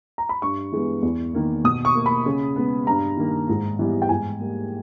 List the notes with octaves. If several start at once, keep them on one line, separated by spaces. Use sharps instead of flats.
A#5
B5
G2 C#6
E3 G#3 B3
E2
D#3 A#3
B2 D#6
C#6
A#3
B5
C#3
G#3 B3
G2 A#5
D#3 A#3
G#2
E3 G3 B3
G5
G#2 G#5
G3 A#3